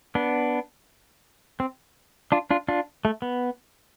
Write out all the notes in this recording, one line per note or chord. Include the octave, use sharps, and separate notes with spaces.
B3 D4
C4
D4 F4
D4 F4
D4 F4
A3
B3